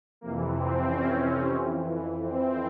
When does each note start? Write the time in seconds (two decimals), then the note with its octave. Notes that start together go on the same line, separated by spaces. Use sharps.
0.21 F2 C3 E3 A#3
0.55 C4
0.88 C#4
1.55 F2 E3
2.22 C4